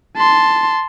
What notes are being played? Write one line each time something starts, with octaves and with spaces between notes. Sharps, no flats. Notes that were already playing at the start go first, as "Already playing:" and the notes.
A5 C6